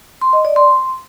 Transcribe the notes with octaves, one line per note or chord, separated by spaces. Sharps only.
C6
D#5
D5
C6